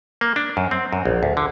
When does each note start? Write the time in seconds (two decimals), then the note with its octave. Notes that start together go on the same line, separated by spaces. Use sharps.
0.21 A#3
0.36 D4
0.57 F#2
0.71 C4
0.93 F#2
1.05 A#1
1.23 D2
1.37 D3